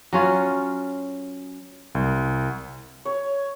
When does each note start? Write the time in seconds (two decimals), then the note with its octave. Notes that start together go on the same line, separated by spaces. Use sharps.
0.13 F#3 C#4 F4
1.95 C2
3.05 C#5